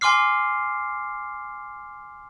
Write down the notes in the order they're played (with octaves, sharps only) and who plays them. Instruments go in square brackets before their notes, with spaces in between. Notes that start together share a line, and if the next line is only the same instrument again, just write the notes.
[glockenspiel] G#5 C6 D6 F6 C7